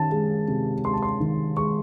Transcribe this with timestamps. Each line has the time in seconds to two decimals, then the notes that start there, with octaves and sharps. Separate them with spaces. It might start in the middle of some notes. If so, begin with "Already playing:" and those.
Already playing: D#3 C#4 A5
0.12 G#3
0.48 C3
0.85 G#3 C6
0.93 A5
1.02 C6
1.20 D#3
1.57 G#3 C#6